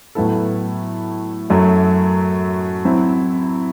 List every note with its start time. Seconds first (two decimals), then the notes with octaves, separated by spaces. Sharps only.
0.15 A2 F#3 B3 E4 A4
1.50 F#2 F#3 A3
2.85 F#3 C4 E4